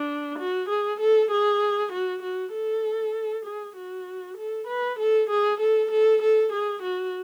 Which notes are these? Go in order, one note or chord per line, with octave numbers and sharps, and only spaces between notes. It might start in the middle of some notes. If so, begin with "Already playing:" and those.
Already playing: D4
F#4
G#4
A4
G#4
F#4
F#4
A4
G#4
F#4
A4
B4
A4
G#4
A4
A4
A4
G#4
F#4